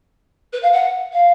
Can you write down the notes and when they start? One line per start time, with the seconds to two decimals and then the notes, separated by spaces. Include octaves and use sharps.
0.53 B4
0.63 F5
0.73 F#5
1.13 F5